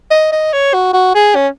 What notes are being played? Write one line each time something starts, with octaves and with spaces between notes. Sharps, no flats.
D#5
D#5
C#5
F#4
F#4
G#4
C#4